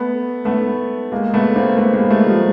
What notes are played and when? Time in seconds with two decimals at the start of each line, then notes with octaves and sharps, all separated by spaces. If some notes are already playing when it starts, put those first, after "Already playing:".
Already playing: A3 B3
0.45 A3 B3
1.12 G#3 A#3
1.34 A3 B3
1.56 A#3 C4
1.78 A3 B3
1.93 G#3 A#3
2.10 G3 A3
2.26 F3 G3